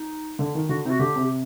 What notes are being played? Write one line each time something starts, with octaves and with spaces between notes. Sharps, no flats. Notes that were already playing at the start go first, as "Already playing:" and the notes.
Already playing: D#4
D3
D#3
D3 F#4
C3 D#4 F#4
D3 G4
C3
G4